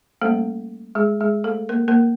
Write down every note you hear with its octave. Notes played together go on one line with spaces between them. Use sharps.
G3 A3 A#3 C#4 A4
G#3 G#4
G#3 G#4
A3 A4
A#3 A#4
A#3 A#4